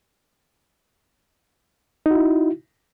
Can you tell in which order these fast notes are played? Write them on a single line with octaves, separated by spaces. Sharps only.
D#4 F#4 E4